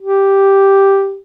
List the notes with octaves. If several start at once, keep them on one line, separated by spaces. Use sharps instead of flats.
G4